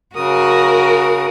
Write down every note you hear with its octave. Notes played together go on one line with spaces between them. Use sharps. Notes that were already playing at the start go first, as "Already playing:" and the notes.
C#3 F#4 A#4 D#6